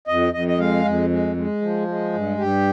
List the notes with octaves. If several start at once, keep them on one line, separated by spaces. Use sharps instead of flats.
F2 D#5
F2 D#5
D#5
G#3 F5
F2
G#3
G#3
F3
G#3
G2
G2 G4